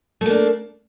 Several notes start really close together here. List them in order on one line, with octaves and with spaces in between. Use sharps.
A3 A#3 D4